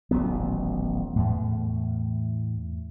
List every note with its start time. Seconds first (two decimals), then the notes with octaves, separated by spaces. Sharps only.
0.11 D#1 A1 F#3 B3
1.16 E2 A2